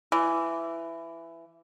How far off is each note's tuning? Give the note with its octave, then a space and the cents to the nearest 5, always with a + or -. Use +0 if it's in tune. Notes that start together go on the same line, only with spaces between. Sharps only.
E3 +15